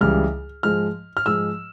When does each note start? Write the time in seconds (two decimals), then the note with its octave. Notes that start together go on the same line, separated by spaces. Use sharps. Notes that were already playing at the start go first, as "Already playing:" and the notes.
0.01 C#2 C#3 E3 G3 F6
0.63 G#2 F3 G#3 F6
1.17 F6
1.26 G#2 F3 G#3 E6